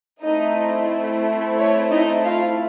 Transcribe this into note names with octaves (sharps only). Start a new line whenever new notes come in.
A3 C4 D#4 E4 D#5
C#5
D#4 D#5
F4 F5